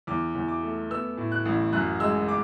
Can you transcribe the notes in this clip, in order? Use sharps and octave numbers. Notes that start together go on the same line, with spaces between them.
E2 D6
E2
D6
A3
B3 E6
A2
F#6
A1
F#2 F#6
G#3 E6
D6